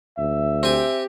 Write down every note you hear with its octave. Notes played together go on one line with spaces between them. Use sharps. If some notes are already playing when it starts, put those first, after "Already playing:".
D2 E5
C4 G4 G#5